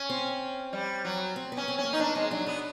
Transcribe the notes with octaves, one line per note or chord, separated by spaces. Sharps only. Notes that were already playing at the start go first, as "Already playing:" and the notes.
Already playing: C#4
C4
G3
F#3
C4
B3
C#4
C4
C#4
A#3
D#4
B3 D4
G#3 C4
F#3 D4
B3 D4